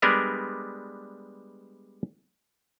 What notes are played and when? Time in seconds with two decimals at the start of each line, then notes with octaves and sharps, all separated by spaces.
0.02 G3 G#3 B3 D4 A#4 B4